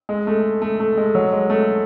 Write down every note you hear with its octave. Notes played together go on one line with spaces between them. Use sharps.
G#3
A3
A3
A3
G#3
F#3
G#3
A3